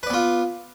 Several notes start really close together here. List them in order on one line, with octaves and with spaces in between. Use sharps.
B4 D5 B3 F4